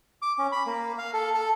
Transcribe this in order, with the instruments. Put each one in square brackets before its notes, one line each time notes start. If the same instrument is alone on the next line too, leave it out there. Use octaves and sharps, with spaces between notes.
[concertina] D6
C#4
B5
A#3
F5
A4
A4